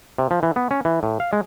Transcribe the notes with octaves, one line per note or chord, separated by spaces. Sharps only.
C3
F3
E3
B3
C#4
E3
A2
F5
G#3